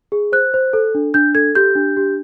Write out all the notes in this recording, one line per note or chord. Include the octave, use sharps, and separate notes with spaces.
G#4
C5 F#6
C5
A4
D4
D4 G6
A4 G#6
G4 G6
D4
G4